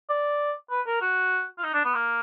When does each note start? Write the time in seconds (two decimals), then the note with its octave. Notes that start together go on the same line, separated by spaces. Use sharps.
0.09 D5
0.71 B4
0.87 A#4
1.02 F#4
1.58 F4
1.63 D#4
1.74 D4
1.85 B3
1.95 A#3